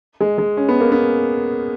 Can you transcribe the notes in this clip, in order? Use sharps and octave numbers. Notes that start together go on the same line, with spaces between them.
G#3
G#3
C#4
B3
A#3
B3